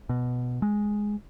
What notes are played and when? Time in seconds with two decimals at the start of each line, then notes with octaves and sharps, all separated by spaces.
0.09 B2
0.62 G#3